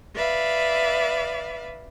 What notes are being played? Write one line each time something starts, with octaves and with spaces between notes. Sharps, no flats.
B4 D5 E5 F5